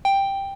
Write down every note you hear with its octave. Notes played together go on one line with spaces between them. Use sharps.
G5